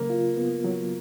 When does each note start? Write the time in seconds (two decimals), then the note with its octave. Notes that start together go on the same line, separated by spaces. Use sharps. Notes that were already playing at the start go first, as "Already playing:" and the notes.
Already playing: C#3 F#3 A#3
0.10 F4
0.37 B3
0.64 F#3